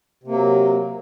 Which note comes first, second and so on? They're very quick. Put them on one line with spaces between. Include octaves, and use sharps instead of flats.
C3 A#3 F#3